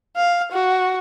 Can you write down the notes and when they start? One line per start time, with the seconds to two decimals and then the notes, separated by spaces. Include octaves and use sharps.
0.16 F5
0.52 F#4